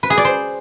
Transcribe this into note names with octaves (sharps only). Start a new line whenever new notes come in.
B4
G#4
D5
C5